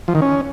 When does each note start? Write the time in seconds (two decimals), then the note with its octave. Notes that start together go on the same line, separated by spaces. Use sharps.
0.08 F3
0.15 D#3
0.22 C#4